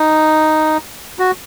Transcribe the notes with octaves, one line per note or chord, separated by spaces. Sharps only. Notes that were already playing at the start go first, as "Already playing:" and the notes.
Already playing: D#4
F#4